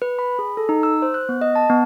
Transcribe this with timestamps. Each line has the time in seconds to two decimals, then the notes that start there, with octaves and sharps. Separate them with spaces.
0.02 B4
0.19 B5
0.39 G#4
0.57 A4
0.69 D#4
0.83 E6
1.02 C5
1.14 F#6
1.29 B3
1.41 D#5
1.56 A5
1.70 B3